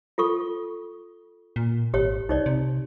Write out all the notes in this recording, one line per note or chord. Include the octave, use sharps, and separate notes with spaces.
F4 A4 C#6
A#2
G#1 G4 C#5
C2 D#4 C#5 D5
C3